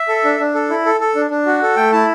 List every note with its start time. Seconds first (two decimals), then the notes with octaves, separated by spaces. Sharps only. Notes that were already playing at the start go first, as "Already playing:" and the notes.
Already playing: E5
0.08 A4
0.25 D4
0.40 D4
0.54 A4
0.70 E4
0.86 A4
1.01 A4
1.15 D4
1.31 D4
1.46 F#4
1.62 A4
1.76 A3 G5
1.92 E4 A5